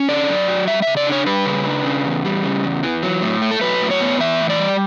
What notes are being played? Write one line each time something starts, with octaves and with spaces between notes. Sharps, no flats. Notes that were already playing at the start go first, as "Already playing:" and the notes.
Already playing: C#4
D3 D5
F#2
F#3
G3 E5
C#3 E5
D5
D4 C#5
G3 B4
C#3
D4
C#3
E2
G3
C#3
E2
E3
F#3
A2
A3
A4
F#3 B4
A2
C#5
B3
E3 E5
A2
D5
G3